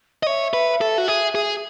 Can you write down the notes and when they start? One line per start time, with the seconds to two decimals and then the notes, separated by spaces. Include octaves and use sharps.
0.23 D#5
0.27 C#5 E5
0.53 B4
0.81 A4
0.98 F#4
1.08 G#4
1.35 G#4